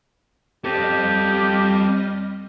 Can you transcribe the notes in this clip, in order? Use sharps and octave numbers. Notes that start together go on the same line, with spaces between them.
G3 C4 G4 A4 D#5 F6